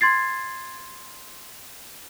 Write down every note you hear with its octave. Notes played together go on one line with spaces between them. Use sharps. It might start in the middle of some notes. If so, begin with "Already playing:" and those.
C6 G#6 A6 C7